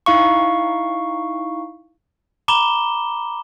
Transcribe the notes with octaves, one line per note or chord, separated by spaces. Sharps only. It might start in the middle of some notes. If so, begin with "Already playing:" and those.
D#4 E4 F5 C#6
A#5 B5 D6 E7 G7